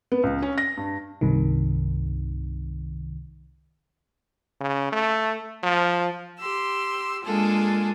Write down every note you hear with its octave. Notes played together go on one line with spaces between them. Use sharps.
B3
C#2
C#4
A#6
G2
C2 G2 C3 D#3
C#3
A3
F3
G4 C6 E6
G#3 A#3 D4 F4 G#4 A4